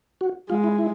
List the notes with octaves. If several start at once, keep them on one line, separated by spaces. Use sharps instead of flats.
F#4
G#3 F4
E4
E4